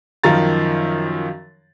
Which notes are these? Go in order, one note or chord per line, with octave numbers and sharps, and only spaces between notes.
F#2 D#3 F3 F5 A#5 A6